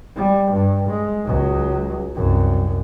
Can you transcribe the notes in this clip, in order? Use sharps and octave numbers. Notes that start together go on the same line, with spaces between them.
G3
G2
G#3
C#2 F#3
C2 F#2